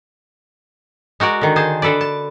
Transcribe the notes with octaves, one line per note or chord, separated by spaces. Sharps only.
G#3 F#4 A#4 D5
D3 D#3
G#4 C5 A5
D3 A4 B4 D5
A5